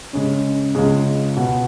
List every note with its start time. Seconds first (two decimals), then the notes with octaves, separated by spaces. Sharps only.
0.13 C#3 G#3 C#4
0.75 C#2 C#3 G#3
1.36 B2 B3 F#4